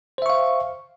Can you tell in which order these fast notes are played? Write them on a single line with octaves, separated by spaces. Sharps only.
C5 E5 C#6 F5